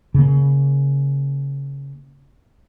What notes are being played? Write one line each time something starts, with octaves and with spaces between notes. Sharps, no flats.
C#3 A#3